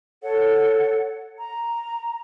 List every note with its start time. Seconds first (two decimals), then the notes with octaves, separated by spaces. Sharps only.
0.23 A4 C#5 F#5
1.38 A#5